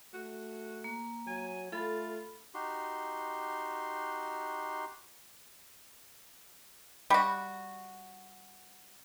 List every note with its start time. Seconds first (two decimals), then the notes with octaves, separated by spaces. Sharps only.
0.14 A3 F#4
0.84 A#3
1.27 F#3 G#5
1.73 A3 F4 A4 B5
2.54 D#4 F#4 G4 C6
7.10 G3 F#4